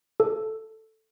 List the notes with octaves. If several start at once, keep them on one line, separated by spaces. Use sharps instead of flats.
A4